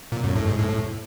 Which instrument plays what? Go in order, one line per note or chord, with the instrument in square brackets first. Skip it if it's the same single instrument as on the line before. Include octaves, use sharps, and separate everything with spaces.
[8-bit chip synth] A#2
F#2
A2
G#2
A2